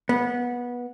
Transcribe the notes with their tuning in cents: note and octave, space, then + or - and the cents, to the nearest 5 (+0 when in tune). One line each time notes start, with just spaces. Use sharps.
B3 -20